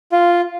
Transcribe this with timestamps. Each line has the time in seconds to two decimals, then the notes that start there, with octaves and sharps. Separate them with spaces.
0.12 F4